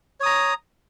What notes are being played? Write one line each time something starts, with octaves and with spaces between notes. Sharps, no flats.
C#5 A#5 D#6